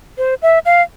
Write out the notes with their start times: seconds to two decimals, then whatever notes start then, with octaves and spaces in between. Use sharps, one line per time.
0.18 C5
0.42 E5
0.66 F5